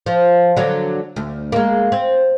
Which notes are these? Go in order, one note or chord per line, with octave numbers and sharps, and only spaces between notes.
F3
D3 F#3
D2
G#3 A#3
C4